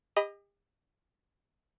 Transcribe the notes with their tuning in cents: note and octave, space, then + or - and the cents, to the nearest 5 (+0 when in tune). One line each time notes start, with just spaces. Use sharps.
G4 +40 D#5 +0 B5 +0